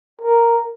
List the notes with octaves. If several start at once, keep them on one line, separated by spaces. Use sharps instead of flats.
A#4